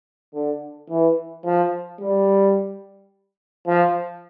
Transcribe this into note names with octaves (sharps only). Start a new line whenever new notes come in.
D3
E3
F3
G3
F3